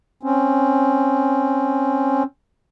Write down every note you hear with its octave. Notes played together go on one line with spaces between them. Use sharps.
C4 C#4